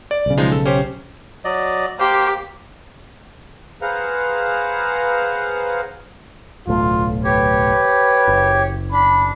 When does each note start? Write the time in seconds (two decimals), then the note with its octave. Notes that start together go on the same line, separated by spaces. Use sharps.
0.11 D5
0.26 B1 C#3
0.38 F3 G#3 D#4
0.52 A4
0.66 C#4 G4 C5
1.44 F#3 D5 D#5
1.99 A#3 G4 C5
3.82 G#4 B4 C5 F5 F#5 A#5
6.67 D1 B1 A3 F4
7.24 G4 B4 C#5
8.27 F#1
8.92 D4 B5